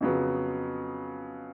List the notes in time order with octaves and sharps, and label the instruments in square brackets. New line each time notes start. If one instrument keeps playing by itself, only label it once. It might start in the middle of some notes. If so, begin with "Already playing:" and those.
[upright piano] F2 C#3 F#3 B3